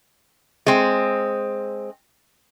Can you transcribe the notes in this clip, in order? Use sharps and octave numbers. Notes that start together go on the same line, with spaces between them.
G#3 C4